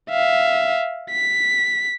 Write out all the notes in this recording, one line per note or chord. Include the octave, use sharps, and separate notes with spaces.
E5 F5
B6